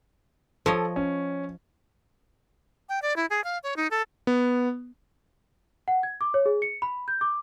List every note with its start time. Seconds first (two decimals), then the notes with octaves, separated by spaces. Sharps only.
0.66 F3 A4 C#5 D#5
0.96 C#4
2.89 G5
3.02 D5
3.16 E4
3.30 G#4
3.44 F5
3.63 C#5
3.76 D#4
3.91 A4
4.27 B3
5.88 F#5
6.03 G#6
6.21 D6
6.34 C#5
6.46 G#4
6.62 C#7
6.82 B5
7.08 G6
7.21 D6